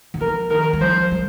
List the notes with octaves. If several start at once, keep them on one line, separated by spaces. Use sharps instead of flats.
D#3
F3 A#4
D#3 A#4
G3
F3 C5
G3